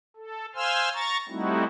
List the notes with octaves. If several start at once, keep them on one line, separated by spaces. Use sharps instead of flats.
A4
C5 F5 G#5 C6 E6 F6
A#5 C#6 A6
G3 A3 C4 D#4 E4 F#4